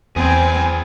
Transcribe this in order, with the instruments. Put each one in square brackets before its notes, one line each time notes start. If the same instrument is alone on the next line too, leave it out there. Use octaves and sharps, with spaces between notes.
[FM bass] E2 [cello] C4 [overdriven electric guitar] G#4 B4 [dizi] G#5